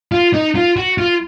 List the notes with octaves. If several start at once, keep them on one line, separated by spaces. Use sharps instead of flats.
F4
D#4
F4
F#4
F4